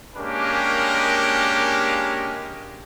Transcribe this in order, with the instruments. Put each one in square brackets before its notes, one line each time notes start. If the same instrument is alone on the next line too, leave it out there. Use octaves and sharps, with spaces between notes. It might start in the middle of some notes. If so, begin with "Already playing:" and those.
[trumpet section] G#3 A#3 C#4 D4 G4 A#4